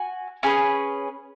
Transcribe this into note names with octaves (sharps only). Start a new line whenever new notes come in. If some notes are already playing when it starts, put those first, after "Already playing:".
Already playing: F#4 G#5
C#4 G#4 B4